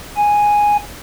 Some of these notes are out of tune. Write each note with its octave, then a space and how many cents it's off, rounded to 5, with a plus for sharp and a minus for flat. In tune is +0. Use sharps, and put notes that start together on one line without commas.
G#5 -5